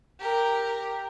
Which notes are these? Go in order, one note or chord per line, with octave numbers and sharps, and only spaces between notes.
G4 A#4